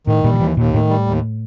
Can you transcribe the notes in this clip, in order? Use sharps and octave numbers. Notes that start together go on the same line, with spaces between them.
A2 D#3
A#2 G3
D#3
D#2 E3
D#2 A#2
A2 D#3
G3
D#2